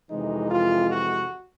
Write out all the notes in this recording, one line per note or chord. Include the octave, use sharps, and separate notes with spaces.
F2 C3 E3 G#3 D#4
F4
F#4